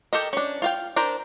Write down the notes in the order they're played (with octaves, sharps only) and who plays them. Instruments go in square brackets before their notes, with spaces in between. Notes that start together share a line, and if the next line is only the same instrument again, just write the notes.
[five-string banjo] G4 A4 A#4 D#5
C#4 D4
F4 F5 G5
D4 A#4 C5